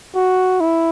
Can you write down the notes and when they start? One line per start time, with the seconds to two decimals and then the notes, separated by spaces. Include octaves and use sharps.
0.15 F#4
0.60 E4